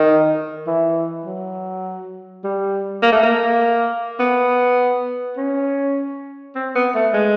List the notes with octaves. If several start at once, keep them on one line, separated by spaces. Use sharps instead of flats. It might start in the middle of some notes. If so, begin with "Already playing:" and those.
Already playing: D#3
E3
F#3
G3
A#3
A3
A#3
B3
C#4
C4
B3
A3
G#3